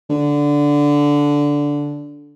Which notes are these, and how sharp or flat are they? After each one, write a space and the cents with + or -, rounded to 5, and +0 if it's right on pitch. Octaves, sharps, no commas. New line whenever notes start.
D3 -10